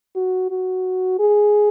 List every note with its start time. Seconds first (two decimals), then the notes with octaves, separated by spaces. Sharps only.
0.16 F#4
0.51 F#4
1.19 G#4